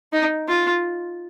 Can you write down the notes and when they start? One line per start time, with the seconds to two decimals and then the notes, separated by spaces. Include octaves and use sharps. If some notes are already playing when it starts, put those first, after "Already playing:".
0.13 D#4
0.48 F4